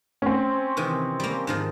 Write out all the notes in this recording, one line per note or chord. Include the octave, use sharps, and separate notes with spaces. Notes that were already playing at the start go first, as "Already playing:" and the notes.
C4 C#4
C3 D#3 E3
G3 A#3
G#2 D#3 F3